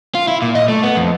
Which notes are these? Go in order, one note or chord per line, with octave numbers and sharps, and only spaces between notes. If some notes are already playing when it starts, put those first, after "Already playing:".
F4
E4
A#2
D#5
A3
B3
F2